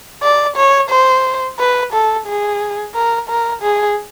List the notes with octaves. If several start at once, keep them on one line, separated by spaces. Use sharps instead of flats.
D5
C#5
C5
B4
A4
G#4
A#4
A#4
G#4